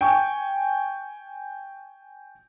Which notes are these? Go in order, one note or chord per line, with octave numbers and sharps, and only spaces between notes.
G5 G#5 C#6